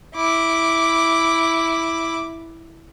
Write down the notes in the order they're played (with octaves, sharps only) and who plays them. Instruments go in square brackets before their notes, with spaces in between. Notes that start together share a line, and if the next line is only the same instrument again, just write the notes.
[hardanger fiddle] E4 D6